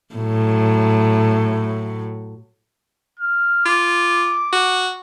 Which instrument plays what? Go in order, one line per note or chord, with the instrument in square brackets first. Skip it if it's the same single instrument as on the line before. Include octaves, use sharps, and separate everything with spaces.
[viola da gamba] A2 F#3
[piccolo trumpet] F6
[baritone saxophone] F4 [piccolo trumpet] D6
[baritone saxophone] F#4